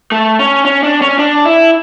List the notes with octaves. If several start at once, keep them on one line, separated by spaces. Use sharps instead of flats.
A3
C#4
C#4
D4
C#4
D4
E4